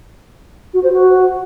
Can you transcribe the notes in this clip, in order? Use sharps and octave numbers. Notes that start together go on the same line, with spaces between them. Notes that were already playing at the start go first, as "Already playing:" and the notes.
F#4
C5
F#4